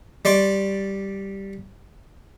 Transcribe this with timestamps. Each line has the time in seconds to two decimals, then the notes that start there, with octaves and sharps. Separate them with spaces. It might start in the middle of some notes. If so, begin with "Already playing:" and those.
0.25 G3 D5 C6 C#6